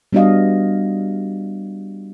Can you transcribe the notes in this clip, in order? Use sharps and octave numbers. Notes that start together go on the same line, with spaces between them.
G3 B3 D4 F#4 D#5 F5